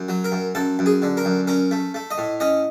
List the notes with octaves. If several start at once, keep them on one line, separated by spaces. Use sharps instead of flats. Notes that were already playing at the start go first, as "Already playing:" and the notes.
Already playing: F#2
F#3
A#4
F#2
F#2 A4
F#2
G#4
D3
A#4
F#2
C#4 A#4
A3
A3
D#5
A2
C#4 D#5